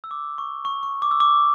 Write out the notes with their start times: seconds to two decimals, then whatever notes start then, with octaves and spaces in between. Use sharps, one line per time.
0.04 E6
0.11 D6
0.38 C#6
0.65 C#6
0.83 C#6
1.02 D6
1.11 E6
1.20 D6